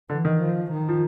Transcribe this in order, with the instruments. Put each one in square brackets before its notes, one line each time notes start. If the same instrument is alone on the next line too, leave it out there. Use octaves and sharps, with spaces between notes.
[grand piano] D3 [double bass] E3
[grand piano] D#3
[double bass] F3
D#3
[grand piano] F3